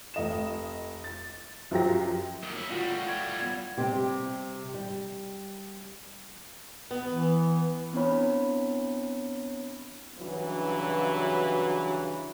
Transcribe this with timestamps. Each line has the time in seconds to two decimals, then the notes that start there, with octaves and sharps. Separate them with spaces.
0.14 F1 D#5 E7
1.04 A6
1.71 F#2 F3 F#3 F4 G4 A#6
2.43 A#2 D#3
2.56 C#4 E4
2.71 A2 G3 F4 F#4
3.08 G5 G#6
3.40 B3 G#6
3.77 C3 G3 C4 G4
4.74 G3
6.91 B3
7.09 E3
7.93 B3 C4 D4 E4 C#5 B5
10.18 G2 C#3 E3 F#3